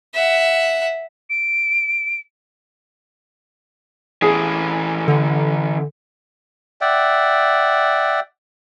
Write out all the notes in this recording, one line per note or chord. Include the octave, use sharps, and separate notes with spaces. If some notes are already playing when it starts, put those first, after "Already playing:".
E5 F#5
D7
E3 C#4 G#4
D3
D5 E5 F#5 G5